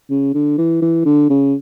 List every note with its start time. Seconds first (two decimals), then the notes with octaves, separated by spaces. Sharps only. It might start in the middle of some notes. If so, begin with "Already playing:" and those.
0.10 C#3
0.34 D3
0.58 E3
0.82 E3
1.05 D3
1.29 C#3